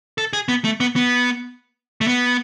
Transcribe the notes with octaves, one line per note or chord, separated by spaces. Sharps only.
A4
G#4
B3
A3
B3
B3
A3
B3